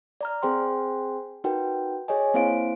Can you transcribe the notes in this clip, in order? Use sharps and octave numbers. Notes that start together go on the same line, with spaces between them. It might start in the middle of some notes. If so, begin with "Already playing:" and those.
D5 A#5 F6
C4 G#4 C5 G5 C6
D#4 F#4 A#4 B4 G5
G#4 C#5 D#5 G#5
A#3 C4 E4 C5 F5 D7